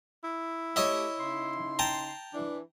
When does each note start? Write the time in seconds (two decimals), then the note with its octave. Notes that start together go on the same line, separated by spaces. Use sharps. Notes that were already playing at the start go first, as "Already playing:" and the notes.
0.24 E4
0.76 A3 G4 C#5 D#5 E5
1.19 C#3 D#4 C6
1.79 G5 A5 A#5
2.34 E3 D4